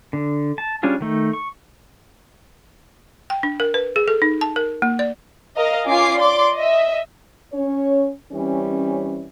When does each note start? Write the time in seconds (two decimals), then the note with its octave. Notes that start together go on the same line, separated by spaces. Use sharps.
0.13 D3
0.58 A5
0.83 G3 C#4 D4 F4 G#4
1.01 D#3 A3 D#4
1.33 C#6
3.30 G5
3.43 D4
3.60 A#4
3.74 B4
3.96 G#4
4.08 A4
4.22 D#4
4.41 A5
4.56 A#4
4.82 A#3
4.99 D5
5.56 A#4 D#5 F5
5.87 C#4 F4 G#5 D6 C7
6.17 D5 C6 D6
6.56 D#5 E5
7.53 C#4 C#5
8.31 E3 G3 C4 C#4